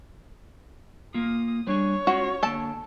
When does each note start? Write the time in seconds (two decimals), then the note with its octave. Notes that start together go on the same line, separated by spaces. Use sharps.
1.14 A#3 F4 D#6
1.67 G3 D4 G#4 C#5
2.07 G#3 C#4 F4 F#4
2.43 D3 A#3 A4 G5 A5